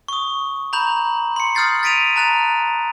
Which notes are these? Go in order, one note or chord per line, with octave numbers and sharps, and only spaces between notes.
C#6 D#6
A#5 B5 G6 F#7
C6 C#7
D#6 F6 G6 A6 C7
A6 B6 D7 D#7 F7
A5 A#5 F#6 A6 F7